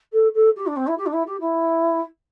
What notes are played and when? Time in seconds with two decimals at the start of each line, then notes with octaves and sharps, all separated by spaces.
0.12 A4
0.34 A4
0.56 G4
0.66 D4
0.76 C4
0.87 E4
0.97 G4
1.06 D4
1.13 E4
1.26 G4
1.40 E4